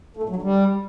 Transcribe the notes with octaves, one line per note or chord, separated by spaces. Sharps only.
A3
A#2
F#3
D3
G3